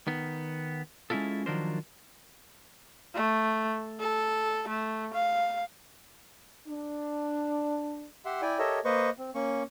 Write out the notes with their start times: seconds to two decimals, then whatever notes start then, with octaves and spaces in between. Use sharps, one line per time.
0.07 D#3 B3
1.10 G#3 C#4 D4 E4 F4 A4
1.46 D#3 F3 F#3 D4 A#4 C5
3.14 A3
4.00 A4
4.68 A3
5.14 F5
6.67 D4
8.25 G4 E5 F#5 C6
8.42 E4 D5 G5 G#5
8.59 G4 A4 A#4 C#5 D#5 E5
8.85 A#3 B4 C5 D#5 C#6
9.18 C4
9.35 A#3 C#4 C#6